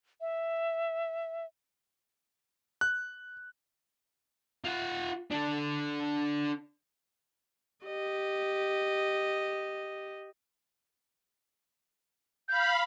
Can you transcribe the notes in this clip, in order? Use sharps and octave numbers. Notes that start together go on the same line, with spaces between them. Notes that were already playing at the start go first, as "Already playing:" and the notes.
E5
F#6
F4 F#5
D4 A4
G4 D#5
F5 B5 G6